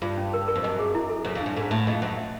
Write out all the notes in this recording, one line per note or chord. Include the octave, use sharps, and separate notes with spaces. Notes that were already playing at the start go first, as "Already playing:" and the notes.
G2 F4
C#4
A#4
A#4
F2
F#2 D#5
G#4
E4
A4
F#2 C#5
F2
D4
G2
G#2 A4
A2 E5
F2 D#5
F#2 F#5
E5